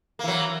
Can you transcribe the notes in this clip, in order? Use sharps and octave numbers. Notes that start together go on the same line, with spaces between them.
E3 F#3 A#3